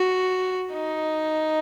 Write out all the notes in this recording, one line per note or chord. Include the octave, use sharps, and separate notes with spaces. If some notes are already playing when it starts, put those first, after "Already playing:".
Already playing: F#4
D#4